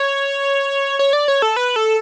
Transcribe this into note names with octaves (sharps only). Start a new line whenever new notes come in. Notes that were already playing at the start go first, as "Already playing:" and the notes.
Already playing: C#5
C#5
D5
C#5
A4
B4
A4